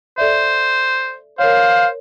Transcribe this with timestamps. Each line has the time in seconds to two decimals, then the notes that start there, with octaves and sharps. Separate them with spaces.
0.18 A4 C5 D5 E5
1.39 A#4 C5 C#5 F5